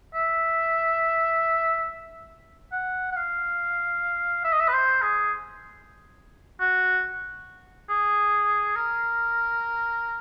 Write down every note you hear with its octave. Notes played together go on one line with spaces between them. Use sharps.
E5
F#5
F#5
F5
E5
D#5
E5
B4
C5
G#4
F#4
G#4
A#4